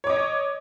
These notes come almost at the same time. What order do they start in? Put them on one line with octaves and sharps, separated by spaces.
C#5 D6 D#5